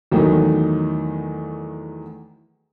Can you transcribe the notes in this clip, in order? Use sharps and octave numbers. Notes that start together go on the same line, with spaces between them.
E2 D#3 F#3 A3 D#4